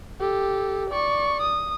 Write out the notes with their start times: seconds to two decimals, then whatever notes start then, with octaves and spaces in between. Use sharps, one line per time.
0.20 G4 A4
0.90 D5 C#6
1.41 D#6